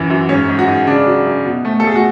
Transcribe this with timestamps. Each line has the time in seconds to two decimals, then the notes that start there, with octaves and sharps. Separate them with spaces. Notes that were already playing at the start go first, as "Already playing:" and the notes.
Already playing: F#2 E3 F#3
0.10 F#2
0.29 G#2 C#4
0.49 G#2
0.59 F#4
0.68 G#2
0.87 C#3 D4
1.06 F#3
1.25 F#2
1.46 B2
1.65 A3
1.80 A4
1.84 A3 G#4
1.96 F#4